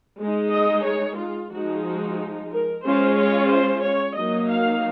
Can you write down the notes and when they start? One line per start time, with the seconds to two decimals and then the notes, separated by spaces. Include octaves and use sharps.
0.19 G#3 D#4
0.52 D#5
0.86 C#5
1.19 F4
1.52 F3 G#3 D#4 F#4
1.85 F#4
2.52 A#4
2.85 G#3 C#4 F4 C5
3.18 C#5
3.52 C5
3.85 C#5
4.18 F#3 A#3 D#4 D#5
4.51 F5